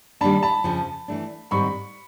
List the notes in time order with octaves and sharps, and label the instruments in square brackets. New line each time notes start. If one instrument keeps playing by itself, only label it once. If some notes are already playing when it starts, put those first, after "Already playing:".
[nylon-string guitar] D#3 G3 A#3 D4 [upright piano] A5 B5
[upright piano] A5 B5
[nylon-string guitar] F2 C#3 F3
E3 A3 D4
[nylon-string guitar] G#2 D#3 G3 C4 [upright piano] B5 C#6